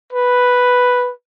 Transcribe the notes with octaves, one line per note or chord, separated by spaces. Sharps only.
B4